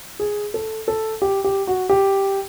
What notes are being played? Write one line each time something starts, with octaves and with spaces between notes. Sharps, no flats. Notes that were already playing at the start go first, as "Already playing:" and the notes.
G#4
A4
A4
G4
G4
F#4
G4